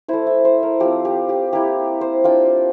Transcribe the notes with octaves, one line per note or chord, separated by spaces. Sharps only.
A3 E4 C5
E5
C5
A#4
F3 C4 F4 G4
G4
G4
A#3 E4 G4
C5
A#3 D4 F4 G5